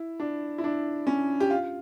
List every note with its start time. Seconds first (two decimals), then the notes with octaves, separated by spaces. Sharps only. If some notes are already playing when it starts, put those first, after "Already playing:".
Already playing: E4
0.20 D4
0.58 E4
0.64 D4
1.07 C#4
1.40 G4
1.50 F4